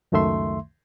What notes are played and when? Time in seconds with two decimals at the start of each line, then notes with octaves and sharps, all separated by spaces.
0.12 C#2 F#2 D#3 A3 E5 C6